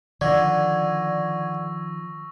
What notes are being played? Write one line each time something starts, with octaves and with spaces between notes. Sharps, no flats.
D3 D#3 F3 D5 C#6 E6 G#6 A#6